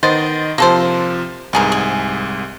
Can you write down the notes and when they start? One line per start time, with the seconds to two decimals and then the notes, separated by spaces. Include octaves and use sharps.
0.03 D#3 B3 C5 D#5 A6
0.58 C3 F3 A#3 A4 C5
1.53 C2 G#2 B3 G#4 A#4
1.72 G#4